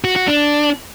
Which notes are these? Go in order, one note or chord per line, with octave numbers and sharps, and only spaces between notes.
F#4
F#4
D4